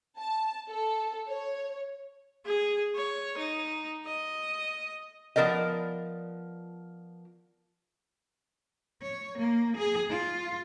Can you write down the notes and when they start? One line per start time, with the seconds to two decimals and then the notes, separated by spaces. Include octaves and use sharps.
0.17 A5
0.69 A4
1.27 C#5
2.45 G#4
2.95 C#5
3.37 D#4
4.06 D#5
5.36 F3 B3 A#4 D5 D#5
9.02 C#5
9.39 A#3
9.77 G#4
10.10 F4